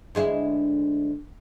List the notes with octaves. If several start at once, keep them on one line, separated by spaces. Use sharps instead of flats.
D2 G#3 E4